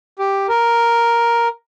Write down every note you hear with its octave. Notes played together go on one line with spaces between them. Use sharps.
G4
A#4